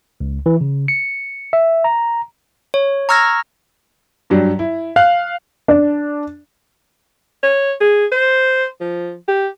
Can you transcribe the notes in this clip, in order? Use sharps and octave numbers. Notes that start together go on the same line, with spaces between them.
C#2
E3
C#3
C#7
E5
A#5
C#5
A#5 C#6 E6 F6 G#6 A#6
G2 F#3 G3
E4
F5 F#6
D4
C#5
G#4
C5
F3
G4